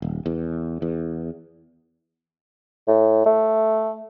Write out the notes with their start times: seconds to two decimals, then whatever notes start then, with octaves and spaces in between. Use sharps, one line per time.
0.02 D#1
0.26 E2
0.82 E2
2.88 A2
3.26 A3